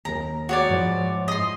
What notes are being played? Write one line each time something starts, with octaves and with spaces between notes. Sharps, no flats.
D#2 A#4 A#5
F#4 C#5 D5
G#2 F3 E4
D#5 C6